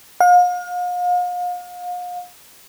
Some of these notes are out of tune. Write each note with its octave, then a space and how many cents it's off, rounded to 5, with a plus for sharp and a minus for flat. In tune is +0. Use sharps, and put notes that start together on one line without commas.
F5 +40